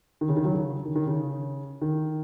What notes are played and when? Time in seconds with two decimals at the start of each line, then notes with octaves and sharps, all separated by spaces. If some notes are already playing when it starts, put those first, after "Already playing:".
0.21 D#3
0.29 C#3
0.37 D#3
0.45 F#3
0.53 C#3
0.85 D#3
0.96 D#3
1.07 C#3
1.82 D#3